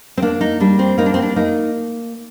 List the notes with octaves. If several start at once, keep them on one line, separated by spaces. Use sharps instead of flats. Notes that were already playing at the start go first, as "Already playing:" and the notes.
C4
A#3 D4
D#4
G3 D4
C4
A#3 D#4
D4
C4
D4
A#3 D#4